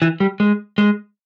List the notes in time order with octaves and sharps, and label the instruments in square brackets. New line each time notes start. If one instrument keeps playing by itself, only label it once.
[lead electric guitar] E3
G3
G#3
G#3